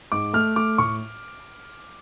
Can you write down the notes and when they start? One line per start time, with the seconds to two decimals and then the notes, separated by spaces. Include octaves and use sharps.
0.12 G#2 D6
0.33 A3 F6
0.56 A3 D6
0.78 A2 C#6